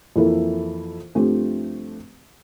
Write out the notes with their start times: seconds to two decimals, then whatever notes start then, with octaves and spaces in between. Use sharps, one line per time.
0.16 F2 E3 A#3 E4 A4
1.15 G2 F3 A3 C4 G4